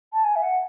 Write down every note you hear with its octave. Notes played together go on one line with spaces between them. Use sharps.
A5
G#5
E5
F#5